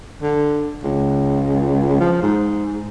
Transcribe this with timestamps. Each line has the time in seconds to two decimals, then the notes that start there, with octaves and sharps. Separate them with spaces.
0.22 D3
0.83 C#2
2.00 F3
2.22 G#2